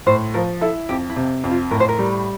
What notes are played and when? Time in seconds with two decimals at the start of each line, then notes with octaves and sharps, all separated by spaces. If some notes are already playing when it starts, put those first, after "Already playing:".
0.06 A2 C5
0.34 F3 A#4
0.61 E4 A4
0.89 F2 G4
1.10 E4
1.16 C3
1.44 F2
1.50 F4
1.71 A2 A#4
1.80 C5
1.89 A#4
1.99 G3